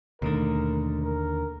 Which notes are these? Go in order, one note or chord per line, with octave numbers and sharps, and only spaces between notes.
D#2 B2 D3 D#3 A3 A#4
A#4